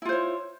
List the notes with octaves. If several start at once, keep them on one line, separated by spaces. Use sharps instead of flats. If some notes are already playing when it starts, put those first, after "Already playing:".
E4 F4 C5 C#5